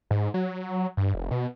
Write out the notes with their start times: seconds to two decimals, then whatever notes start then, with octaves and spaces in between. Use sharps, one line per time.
0.11 G#2
0.34 F#3
0.97 G2
1.14 F1
1.31 B2